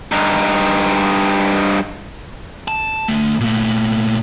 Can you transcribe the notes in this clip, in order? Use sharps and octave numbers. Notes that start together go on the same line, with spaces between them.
G2 D#4
A5
D2 A3
A#2 A3